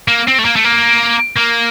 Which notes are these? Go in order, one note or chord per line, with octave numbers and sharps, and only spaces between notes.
A#3
C4
A3
A#3
A3
A#3
A#3